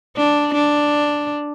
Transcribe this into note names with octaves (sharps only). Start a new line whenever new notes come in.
D4
D4